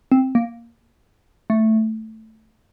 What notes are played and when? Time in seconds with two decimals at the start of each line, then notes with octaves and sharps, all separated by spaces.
0.12 C4
0.35 A#3
1.50 A3